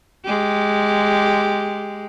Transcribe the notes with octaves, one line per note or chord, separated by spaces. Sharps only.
G#3 G4